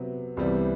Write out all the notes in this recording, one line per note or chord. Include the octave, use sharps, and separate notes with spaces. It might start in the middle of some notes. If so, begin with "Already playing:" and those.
Already playing: C3 F#3 B3
C2 C3 E3 G3 B3